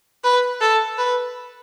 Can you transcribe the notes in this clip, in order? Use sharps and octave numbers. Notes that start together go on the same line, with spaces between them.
B4
A4
B4